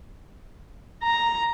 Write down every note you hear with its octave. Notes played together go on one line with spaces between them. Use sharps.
A#5